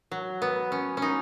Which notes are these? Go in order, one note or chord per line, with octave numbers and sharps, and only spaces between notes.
F#3
B3
C#4
C#4
D#4